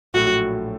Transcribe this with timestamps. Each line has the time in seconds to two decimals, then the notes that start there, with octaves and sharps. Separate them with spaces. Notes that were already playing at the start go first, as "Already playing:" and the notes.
0.14 A#1 A2 F#3 A3 F#4